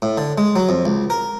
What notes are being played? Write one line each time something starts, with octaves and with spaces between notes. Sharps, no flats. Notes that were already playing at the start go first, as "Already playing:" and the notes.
A2
D3
G#3
F#3
F2
C#2
A#4